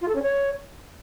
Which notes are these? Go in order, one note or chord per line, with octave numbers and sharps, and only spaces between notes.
F4
A4
C#4
C#5